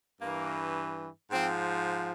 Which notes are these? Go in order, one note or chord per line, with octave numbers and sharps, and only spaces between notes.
G2 E3 A#3
G#2 F3 C4